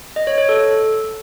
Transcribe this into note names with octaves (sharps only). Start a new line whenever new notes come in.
D#5
C#5
C#5
A4